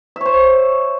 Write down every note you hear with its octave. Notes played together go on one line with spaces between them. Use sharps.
C5 C#5 E5